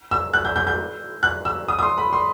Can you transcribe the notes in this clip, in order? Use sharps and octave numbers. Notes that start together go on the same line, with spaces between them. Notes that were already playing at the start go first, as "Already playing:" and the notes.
E6
F#6
G6
G6
G6
F#6
E6
D#6
D#6
C6
B5
C6